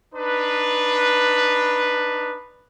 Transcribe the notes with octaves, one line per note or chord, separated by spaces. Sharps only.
D4 D#4 B4